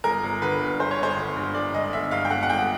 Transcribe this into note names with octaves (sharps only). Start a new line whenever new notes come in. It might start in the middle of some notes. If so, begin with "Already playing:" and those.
G1 A#4
G1
D3 B4
G2
G1 C5
C#5
G1 C5
D3
G2
G1 D5
G1 D#5
D3 E5
G2 F5
G5
G1 F#5
F#5
G1 G5